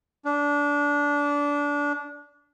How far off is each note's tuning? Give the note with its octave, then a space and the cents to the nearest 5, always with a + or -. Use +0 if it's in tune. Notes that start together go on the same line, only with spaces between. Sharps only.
D4 -20